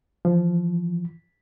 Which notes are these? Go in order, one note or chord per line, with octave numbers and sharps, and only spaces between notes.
E3 F3